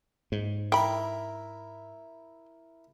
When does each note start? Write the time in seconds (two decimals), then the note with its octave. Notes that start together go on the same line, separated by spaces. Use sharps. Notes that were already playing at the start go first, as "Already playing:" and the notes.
0.32 G#2
0.72 E4 A#4 G5 B5